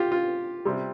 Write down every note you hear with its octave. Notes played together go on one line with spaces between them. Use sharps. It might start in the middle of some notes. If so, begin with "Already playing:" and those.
Already playing: F4 G4
F4
C3 G3